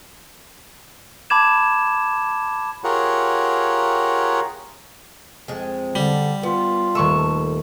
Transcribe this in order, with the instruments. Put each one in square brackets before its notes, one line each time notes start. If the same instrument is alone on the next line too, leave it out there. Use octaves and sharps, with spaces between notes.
[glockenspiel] A5 B5 D6 G#6 E7
[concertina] F4 G4 G#4 A#4 C#5 F#5
[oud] F2 G#3
[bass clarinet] D3 [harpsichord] G3
[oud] B3 [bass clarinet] F4
[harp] D#1 C#6 E6 [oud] A3